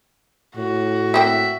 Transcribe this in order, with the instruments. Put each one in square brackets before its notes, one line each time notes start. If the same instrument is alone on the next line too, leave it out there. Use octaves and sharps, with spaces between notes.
[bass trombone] A2 [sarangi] F#4
[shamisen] A#3 C4 G5 [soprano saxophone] E5